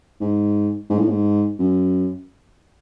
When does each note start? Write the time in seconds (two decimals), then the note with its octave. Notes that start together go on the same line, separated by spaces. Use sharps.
0.20 G#2
0.90 G#2
0.99 A2
1.09 G#2
1.59 F#2